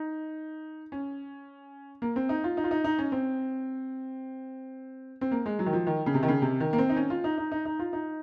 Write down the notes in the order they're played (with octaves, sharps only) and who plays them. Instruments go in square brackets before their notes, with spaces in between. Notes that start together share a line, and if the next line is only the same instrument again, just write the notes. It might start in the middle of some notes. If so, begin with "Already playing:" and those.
Already playing: [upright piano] D#4
C#4
A#3
C4
D#4
F4
D#4
F4
D#4
D#4
C#4
C4
C4
A#3
G#3
F#3
D#3
F3
D#3
C#3
C3
D#3
C#3
C3
D#3
A#3
C4
D#4
C#4
F4
D#4
D#4
D#4
D#4
F4
D#4